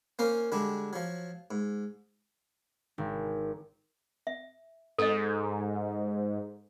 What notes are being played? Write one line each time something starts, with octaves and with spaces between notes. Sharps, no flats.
A#3 C#4 A#4 C5
D3 G3 G#3 D4
F3 F#3
G#2
G#1
E5
G#2 A4 D#5